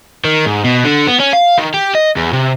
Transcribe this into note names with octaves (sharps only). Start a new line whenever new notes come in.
D#3
G#2
B2
D3
B3
C#4
F5
D#3
G4
D#5
E2
C3